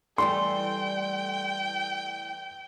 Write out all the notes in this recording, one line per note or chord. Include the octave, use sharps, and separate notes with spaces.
E3 G3 A3 G5 C6